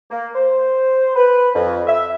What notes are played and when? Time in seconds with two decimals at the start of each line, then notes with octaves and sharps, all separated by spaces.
0.10 A#3
0.35 C5
1.16 B4
1.54 F2
1.86 E5